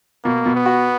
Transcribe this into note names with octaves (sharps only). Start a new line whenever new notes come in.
B2 A#3
B2
B3
F#4